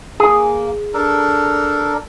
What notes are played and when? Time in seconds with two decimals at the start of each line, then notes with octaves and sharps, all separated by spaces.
0.20 A#3 G#4
0.94 D4 A4 A#4